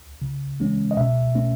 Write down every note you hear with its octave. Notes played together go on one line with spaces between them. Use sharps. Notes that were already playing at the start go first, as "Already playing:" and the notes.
C#3
E3 G#3 C#4
D#5
B2 E5
A3 C#4